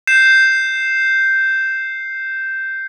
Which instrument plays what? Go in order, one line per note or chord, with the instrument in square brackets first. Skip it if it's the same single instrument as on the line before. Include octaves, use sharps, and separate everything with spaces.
[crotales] G6 C7 E7